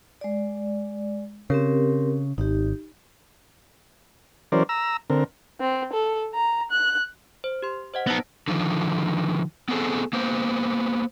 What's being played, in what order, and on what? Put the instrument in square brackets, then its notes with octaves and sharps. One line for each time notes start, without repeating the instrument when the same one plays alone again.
[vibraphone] G#3 D5
[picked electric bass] C#3 [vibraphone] C4 G4 A#4
[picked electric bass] G#1 [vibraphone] D#4 G4
[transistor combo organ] E3 F#3 C#4 A#4 C5 D5
A#5 E6
D3 C4 A#4
[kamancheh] C4
A4
A#5
F#6
[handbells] C5
G4 C6
C5 D#5 F#5
[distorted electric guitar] B3 D#4 [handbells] A5 E6 A#6
[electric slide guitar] D3 D#3 F3
B3 C4 G#4 A4
A#3 B3 C5